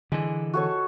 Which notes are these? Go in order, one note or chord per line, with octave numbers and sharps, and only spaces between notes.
D3 E3 G#3
F#4 A4 C#5